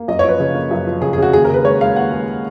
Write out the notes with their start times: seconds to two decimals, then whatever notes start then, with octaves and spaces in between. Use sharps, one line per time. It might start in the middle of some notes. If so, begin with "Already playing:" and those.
Already playing: A#3
0.08 F#2 D#5
0.19 C#5
0.24 F3 B4
0.40 C#3
0.55 A#3
0.71 F#2
0.87 F3
1.02 C#3 G#4
1.13 G#4
1.18 C#3 F#4
1.33 D#2 G#4
1.45 A#4
1.50 C#3 B4
1.65 G#3 C#5
1.81 G#3 F5
1.96 D#2 F#5
2.11 G#3